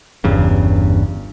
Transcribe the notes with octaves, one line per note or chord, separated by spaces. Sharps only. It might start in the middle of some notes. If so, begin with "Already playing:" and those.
G1 E2 G2 C#3